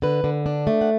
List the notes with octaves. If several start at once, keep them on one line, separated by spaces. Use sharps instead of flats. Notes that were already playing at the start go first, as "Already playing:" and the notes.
D3 B4
D3
D4
A3
F#5